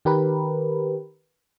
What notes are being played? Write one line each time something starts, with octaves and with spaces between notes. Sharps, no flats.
D#3 G4 A#4 B4